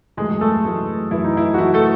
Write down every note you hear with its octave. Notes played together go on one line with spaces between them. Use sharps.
F#2 E3 G#3 A3 G#4
G#4
A3 A4
F#2 E3 A3
F#2 E3 A3 E4
D#4
E4
F#4
F#2 E3 A3 E4
A3 A4